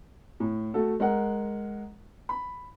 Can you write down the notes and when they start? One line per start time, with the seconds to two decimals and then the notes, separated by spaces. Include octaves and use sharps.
0.40 A2
0.74 A3 F#4 A4
1.00 G#3 A#4 F#5
2.29 B5